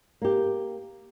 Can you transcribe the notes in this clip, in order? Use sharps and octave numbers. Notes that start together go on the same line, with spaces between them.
A#3 G4